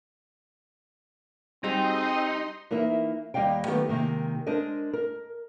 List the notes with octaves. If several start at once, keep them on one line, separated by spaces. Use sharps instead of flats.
G3 C4 D#4 F#4 G#4 D#5 C6
E3 A#3 D#4 A#4 E5
D#2 G3 A#3 D#5 F5 G5
D#3 F#3 A3 B3 G4
C3 D#3 G#3 A#3
G#3 D4 A#4 C5 D#5
A#4